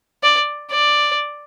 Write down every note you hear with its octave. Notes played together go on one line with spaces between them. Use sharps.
D5
D5